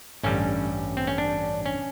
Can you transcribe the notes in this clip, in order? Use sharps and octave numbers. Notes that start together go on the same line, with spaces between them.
A1 G2 D3 G3 C#4
C4
C#4
D4
C#4